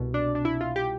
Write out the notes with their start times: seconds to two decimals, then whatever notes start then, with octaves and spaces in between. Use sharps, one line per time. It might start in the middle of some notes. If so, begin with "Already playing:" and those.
Already playing: C2 B2
0.14 D4
0.35 D4
0.45 E4
0.61 F4
0.76 G4